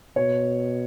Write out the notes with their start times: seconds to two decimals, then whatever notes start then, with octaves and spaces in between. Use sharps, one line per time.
0.16 B2 C#5